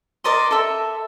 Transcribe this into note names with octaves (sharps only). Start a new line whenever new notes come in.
A#4 D5 D#5 C6
A4 E5